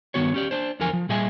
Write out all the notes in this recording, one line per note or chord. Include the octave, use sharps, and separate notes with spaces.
G2 D#3 B3 F#4 C#5
C#4 G4 D5
D4 C5
E2 D3 F3 A#4 G#5
F3
A#2 G3 G#4 D#5 E5 G#5